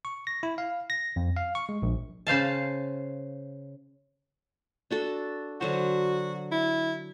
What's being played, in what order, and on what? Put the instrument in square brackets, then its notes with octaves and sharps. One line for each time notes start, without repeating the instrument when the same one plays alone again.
[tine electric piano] C#6
A#6
E4
F5
A#6
F2
F5
C#6
G#3
A#1
[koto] C#3 C5 F5 A5
[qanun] D4 F#4 A4
[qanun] D3 F#3 C5 [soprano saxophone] F#4
[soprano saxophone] E4